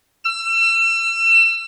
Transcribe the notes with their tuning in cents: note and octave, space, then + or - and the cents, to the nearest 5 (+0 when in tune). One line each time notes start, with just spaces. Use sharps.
E6 +35